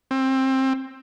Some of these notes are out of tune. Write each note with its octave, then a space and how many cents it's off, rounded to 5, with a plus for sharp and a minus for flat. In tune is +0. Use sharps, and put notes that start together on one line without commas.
C4 +20